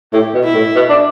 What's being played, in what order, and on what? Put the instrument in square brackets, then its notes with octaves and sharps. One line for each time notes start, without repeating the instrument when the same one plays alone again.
[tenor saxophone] A2 [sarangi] G4
[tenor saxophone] B2
[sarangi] E4
[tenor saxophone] A2
B2
D4